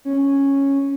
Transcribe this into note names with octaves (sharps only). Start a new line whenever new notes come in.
C#4